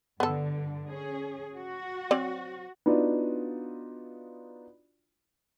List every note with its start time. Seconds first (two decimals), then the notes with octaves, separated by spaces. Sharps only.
0.20 G2 D3 B3 A4
0.88 C#4 G#4
1.57 F#4
2.11 F#3 C4 D5
2.86 B3 D4 D#4 F4 F#4 D5